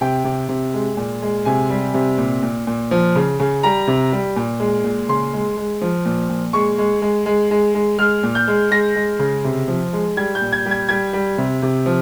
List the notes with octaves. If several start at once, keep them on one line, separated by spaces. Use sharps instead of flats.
C3 G5
C3
C3
G#3
A#2
G#3
C3 G#5
G3
C3
A#2
A#2
A#2
F3
C#3
C#3
G3 A#5
C3
G3
A#2
G#3
A#2
C#3 C6
G#3
G#3
F3
A#2
A#2
G#3 C#6
G#3
G#3
G#3
G#3
G#3
G#3 F6
A#2
G6
G#3
G#3 A#6
G#3
C#3
C3
F3
G#3
G3 G#6
G6
A#2
G#6
G3
G#6
G3 G#6
G3
C3
C3
F3